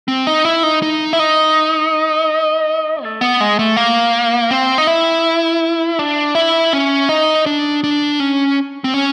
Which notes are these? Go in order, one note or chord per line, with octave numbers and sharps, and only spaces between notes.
C4
D#4
E4
D#4
D#4
E4
D#4
A3
B3
G#3
A3
A#3
C4
D#4
E4
D4
E4
C#4
D#4
D4
D4
C#4
C4
C#4